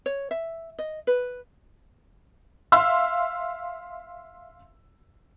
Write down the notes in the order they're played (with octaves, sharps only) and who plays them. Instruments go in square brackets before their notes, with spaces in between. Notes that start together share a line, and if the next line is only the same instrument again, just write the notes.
[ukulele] C#5
E5
D#5
B4
[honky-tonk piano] E5 F5 C6 E6